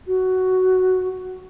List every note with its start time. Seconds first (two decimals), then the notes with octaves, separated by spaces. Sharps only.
0.07 F#4